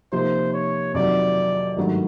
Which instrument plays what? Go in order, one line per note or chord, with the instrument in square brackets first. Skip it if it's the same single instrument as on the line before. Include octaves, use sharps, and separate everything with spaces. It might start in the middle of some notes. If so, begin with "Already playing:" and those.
[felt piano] C3 F3 A#3 D#4 [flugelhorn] C5
[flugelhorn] C#5
[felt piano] F2 C3 D#3 F#3 [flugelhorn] D5
[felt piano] G#1 G2 D#3 F#3 A3